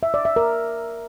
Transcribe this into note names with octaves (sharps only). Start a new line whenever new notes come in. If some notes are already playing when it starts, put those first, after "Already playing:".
E5
D5
E5
A#4